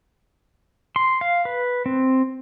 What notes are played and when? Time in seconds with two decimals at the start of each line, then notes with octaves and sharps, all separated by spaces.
0.96 C6
1.21 F5
1.45 B4
1.86 C4